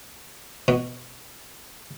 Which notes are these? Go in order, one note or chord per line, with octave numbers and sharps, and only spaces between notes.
B2